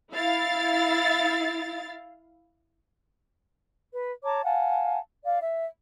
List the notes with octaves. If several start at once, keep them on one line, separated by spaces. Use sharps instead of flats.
E4 F5 A6
B4
C#5 A5 A#5 D6
F5 F#5 G#5 A5
D5 F5
E5